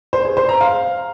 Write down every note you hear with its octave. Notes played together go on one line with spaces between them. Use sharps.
C5
G#4
C5
A#5
F5